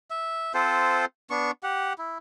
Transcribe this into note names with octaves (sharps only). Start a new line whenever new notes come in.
E5
C4 F4 A4 C5
B3 D4 C#6
G4 F#5
E4